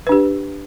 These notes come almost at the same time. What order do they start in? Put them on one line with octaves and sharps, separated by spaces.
B4 D4 G4